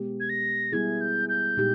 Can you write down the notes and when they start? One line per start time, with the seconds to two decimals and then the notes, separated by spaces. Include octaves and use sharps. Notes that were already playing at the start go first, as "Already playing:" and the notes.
Already playing: B2 G#3 B3 G4
0.20 G#6
0.29 A#6
0.72 G3 B3 E4 G#4 G#6
1.01 G6
1.29 G6
1.57 A#2 G#3 D#4 G4